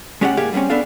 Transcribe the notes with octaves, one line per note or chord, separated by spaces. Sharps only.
G#3 C#4 G4 D5 D#5 F#5
G#2 A#3 G4 G#4 F5
G3 A3 A#3 C4 C#4
B3 D4 A4 F5